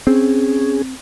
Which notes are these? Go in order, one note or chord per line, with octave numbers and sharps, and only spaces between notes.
C4 C#4 G#4